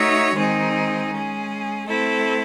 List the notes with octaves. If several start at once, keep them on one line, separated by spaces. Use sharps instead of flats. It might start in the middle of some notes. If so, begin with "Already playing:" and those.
Already playing: A3 D#4 F#4 C#5 E5
D#3 G#3 C4 D#4 G#4
G#3 C#4 G#4
A3 C4 E4 A4